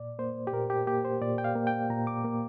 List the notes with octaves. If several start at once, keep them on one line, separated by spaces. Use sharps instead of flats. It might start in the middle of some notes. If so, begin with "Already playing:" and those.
Already playing: A#2 D5
A#3 C5
G4
A#2 A#4
G4
A#3 G4
C5
A#2 D5
G5
F5
A#3
G5
A#2 A#5
D6
A#3